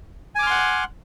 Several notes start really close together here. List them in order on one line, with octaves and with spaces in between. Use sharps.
G#5 D6 F6 C6 F#5